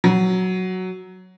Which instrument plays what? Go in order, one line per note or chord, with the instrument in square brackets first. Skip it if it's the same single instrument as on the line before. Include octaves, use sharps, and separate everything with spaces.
[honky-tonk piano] F#3